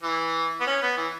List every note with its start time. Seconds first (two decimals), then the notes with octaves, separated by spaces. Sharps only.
0.03 E3
0.60 B3
0.66 C#4
0.82 B3
0.97 E3